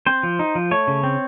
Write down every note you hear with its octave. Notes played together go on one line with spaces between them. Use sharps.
C4 C5
F3
D#4
F3
A3 C#5
C#3
C4